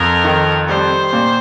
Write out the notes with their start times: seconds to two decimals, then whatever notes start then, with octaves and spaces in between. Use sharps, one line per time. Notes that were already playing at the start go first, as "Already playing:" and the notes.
Already playing: F2 A#4
0.24 D#3
0.69 G3 C5
1.13 A#2